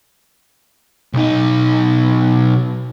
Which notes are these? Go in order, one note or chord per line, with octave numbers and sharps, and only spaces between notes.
B1 D#4